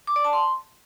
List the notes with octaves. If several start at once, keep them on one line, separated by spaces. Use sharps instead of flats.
D6
D5
A5
C6